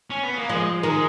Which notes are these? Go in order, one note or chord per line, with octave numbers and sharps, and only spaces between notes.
C#4
B3
A#3
F3 G#3
D#3 G#3